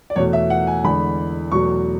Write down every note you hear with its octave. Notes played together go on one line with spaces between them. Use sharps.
D5
E2 B2 A3 C#5
E5
F#5
G#5
E2 D3 G#3 B5
E2 B2 F#3 A3 C#6